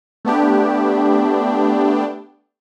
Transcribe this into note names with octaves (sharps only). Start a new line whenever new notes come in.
A3 B3 D4 G4